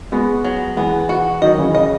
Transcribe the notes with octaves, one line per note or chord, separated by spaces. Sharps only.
G#3 B3 F#4
F#3
E3 G#3 B3
F#4
D#3 F#3 D#5
C#3 E3
C#3 D#5